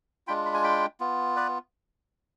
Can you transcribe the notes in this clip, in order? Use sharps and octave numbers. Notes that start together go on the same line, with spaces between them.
G#3 D4 F4 G5 B5
B5
G#5
G5 B5
B3 F4
B4 D5